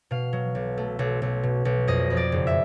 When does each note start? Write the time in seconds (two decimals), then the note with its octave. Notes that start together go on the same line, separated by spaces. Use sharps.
0.11 B2 F5
0.33 F#3
0.55 B1
0.78 A3
0.99 B1
1.22 B1
1.43 B2
1.65 B1
1.87 F2 D#5
2.10 F2
2.17 D5
2.32 F#1
2.47 E5